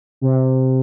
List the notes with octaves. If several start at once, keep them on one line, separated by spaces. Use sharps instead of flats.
C3